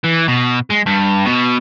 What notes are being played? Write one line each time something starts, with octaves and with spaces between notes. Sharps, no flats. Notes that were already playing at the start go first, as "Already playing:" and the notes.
E3
B2
G#3
G2
B2